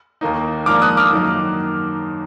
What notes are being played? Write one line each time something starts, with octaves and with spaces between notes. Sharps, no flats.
D#2 D#3 A#3 D#4
G#2 F3 A#3 D4 D6 F6
D#6 F#6
D6 F6
F#2 D#3 A#3 D#4